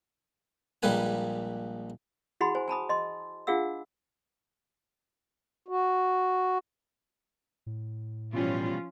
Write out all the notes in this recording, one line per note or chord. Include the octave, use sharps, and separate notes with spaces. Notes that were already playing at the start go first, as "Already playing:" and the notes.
A#1 G3 G#3 A#3 B4 G#5
E4 F#4 G#4 F#5 B5 C6
C5 G#5
G#5 A5 B5 D#6
D#5 C6
D4 F4 G#4 F5 F#5 E6
F#4
A2
B2 E3 F3 G3 C#4 F4